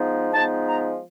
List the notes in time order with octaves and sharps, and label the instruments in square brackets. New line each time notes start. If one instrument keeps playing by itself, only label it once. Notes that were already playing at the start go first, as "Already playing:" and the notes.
Already playing: [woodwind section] F3 G#3 B3 D#4
F3 G#3 B3 D#4 A5
A#5